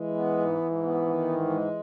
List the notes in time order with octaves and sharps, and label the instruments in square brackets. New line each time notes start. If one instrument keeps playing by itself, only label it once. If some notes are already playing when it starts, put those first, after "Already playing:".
Already playing: [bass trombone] E3 [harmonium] G#3
[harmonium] B3
G#2
G#2
B3
D#3
G#2
G#3